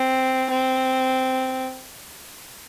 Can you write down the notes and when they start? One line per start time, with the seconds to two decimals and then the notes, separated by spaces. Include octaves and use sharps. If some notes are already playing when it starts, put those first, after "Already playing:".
Already playing: C4
0.50 C4